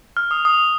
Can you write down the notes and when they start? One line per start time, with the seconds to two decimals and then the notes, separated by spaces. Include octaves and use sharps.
0.17 F6
0.31 D#6
0.45 D#6